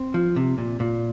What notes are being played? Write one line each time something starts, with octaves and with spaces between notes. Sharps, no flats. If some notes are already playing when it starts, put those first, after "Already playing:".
Already playing: C4
F3
C3
A#2
A#2